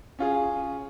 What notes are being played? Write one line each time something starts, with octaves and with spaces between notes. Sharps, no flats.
C#4 F4 G#4